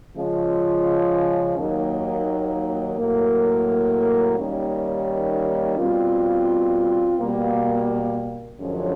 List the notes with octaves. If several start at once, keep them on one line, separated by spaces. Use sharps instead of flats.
C#3 F3 G#3 C#4 F4
D#2 D#3 F#3 A#3
A2 F#3 A#3
D#2 D#3 G3 A#3 C#4
B2 G3 C4 F4
B2 G3 A#3
F#2 D3 F3 G#3 C#4